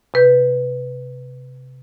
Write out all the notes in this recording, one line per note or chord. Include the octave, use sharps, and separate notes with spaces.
C3 B4 G6